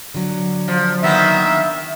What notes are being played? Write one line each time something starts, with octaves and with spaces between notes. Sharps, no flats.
D3 F#3
F3
D#3 A#3 B3 E5